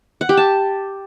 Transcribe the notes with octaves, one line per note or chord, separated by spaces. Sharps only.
F#5
G4
A5